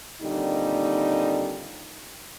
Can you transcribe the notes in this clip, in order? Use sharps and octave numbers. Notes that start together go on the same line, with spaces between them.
D#2 A#2 D3 G3 C4 D#4